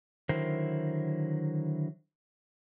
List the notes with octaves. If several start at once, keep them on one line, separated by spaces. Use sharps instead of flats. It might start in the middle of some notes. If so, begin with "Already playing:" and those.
D3 D#3 F#3 E4 A#4 C5